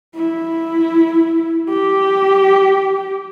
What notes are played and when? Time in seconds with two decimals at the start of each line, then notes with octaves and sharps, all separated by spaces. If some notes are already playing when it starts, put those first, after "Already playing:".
0.15 E4
1.70 G4